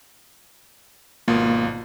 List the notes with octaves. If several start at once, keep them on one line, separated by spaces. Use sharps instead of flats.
G#1 B2 A#3 F4